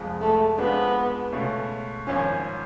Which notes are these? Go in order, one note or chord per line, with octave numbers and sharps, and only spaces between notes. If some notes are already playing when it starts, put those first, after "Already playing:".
Already playing: F1 F2 F3 G#3
A3
F2 F3 G#3 B3 D4 F4
C#2 B2 A3 C#4
G#1 F#2 F3 C#4